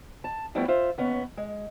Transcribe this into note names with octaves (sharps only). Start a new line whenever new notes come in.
A5
F3 G3 A3 B3 E4
F4 C5 E5
D#2 B3 C#4
G#3